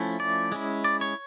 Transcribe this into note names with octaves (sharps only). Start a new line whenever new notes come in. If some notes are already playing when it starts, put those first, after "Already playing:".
Already playing: F3 A3 C#4 E4
D5
G#3 C#4 E4
D5
C#5